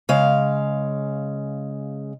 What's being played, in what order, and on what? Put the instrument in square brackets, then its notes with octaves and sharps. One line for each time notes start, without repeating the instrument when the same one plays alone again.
[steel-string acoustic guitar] C#3 G#3 F5